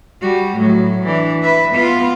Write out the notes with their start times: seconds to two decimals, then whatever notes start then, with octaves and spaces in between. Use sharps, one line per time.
0.21 G3 F#4
0.57 A2 F#3
1.05 E3 D4
1.42 B4 E5
1.74 B3 F4